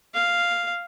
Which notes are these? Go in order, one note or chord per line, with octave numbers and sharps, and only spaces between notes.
F5